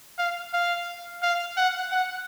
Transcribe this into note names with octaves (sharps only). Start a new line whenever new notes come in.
F5
F5
F5
F#5
F#5